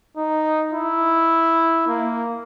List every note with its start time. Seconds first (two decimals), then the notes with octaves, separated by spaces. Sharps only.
0.17 D#4
0.73 E4
1.88 A#3